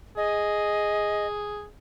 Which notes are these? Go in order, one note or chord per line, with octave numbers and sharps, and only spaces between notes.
G#4 D#5